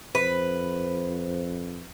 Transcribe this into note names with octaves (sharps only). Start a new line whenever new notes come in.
F2 B4 C5